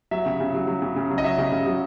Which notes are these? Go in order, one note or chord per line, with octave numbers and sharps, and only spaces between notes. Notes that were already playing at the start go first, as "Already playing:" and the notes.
F#3 E5
C#3
C#3
F#3
F#3
C#3
C#3
F#3
D#5
F#3 E5
C#3
C#3
F#3